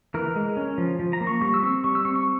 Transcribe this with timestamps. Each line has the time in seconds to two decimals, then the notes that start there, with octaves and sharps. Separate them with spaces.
0.14 E3 A#4
0.36 G#3
0.57 C#4
0.78 F3
0.99 F3
1.13 A#5
1.20 A#3
1.27 C#6
1.41 G3 C#6
1.54 E6
1.63 C4 C#6
1.84 G3 C#6
1.95 E6
2.05 C4 C#6
2.16 C#6